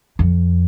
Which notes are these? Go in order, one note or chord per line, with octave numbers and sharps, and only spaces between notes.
F2